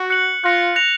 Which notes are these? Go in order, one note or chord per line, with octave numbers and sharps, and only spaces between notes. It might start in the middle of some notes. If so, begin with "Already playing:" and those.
Already playing: F#4
F#6 C#7 F#7
F4 F#6 A#6 C#7
F#6 A#6 C#7 F7